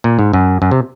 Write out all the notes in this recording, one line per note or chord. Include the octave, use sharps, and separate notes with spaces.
A#2
G#2
F#2
F#2
C3